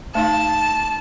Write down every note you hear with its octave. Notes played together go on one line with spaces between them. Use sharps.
A3 D#4 F5 A5